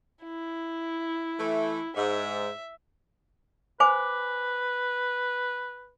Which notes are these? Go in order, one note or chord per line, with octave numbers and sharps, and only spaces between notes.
E4
E3 A3
G#2 E5
B4 C5 G#5 D6